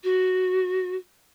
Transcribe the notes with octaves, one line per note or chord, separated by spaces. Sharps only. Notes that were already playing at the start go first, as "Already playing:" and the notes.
F#4